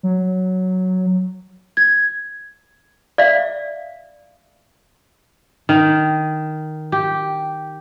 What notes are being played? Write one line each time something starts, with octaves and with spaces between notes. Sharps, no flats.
F#3
G#6
D5 E5 F5
D#3
G4